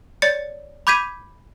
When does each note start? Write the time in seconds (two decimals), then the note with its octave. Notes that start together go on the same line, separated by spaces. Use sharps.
0.22 C#5 D5 A6 C#7
0.87 B5 D6 G6 G#6 B6 D#7